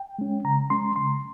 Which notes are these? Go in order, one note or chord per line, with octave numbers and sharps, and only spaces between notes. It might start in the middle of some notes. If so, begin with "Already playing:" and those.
Already playing: G5
G#3 C#4
C#3 A#5
G#3 C#4 C6
C#3 C6